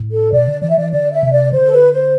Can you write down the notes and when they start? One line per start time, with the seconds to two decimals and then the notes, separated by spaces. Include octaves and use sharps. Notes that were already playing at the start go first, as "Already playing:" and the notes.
Already playing: A2
0.12 A4
0.32 B2 D5
0.47 D3
0.62 E3 D5
0.70 E5
0.78 E3 D5
0.92 D3 D5
1.12 E5
1.23 C3
1.33 D5
1.52 D3 C5
1.65 A4
1.72 B4
1.92 C5